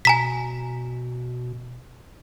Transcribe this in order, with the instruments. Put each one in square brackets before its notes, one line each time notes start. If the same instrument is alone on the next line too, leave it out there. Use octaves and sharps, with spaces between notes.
[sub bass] B2 [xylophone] G#5 A#5 B6